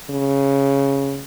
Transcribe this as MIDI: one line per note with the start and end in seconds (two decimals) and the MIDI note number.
0.10 1.23 49